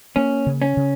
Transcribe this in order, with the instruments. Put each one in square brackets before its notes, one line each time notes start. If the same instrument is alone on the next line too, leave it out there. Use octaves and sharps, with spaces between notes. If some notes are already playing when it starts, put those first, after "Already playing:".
[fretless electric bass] A#3 [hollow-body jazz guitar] C#4
[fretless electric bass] C#3
[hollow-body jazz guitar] C#4
[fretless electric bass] C#3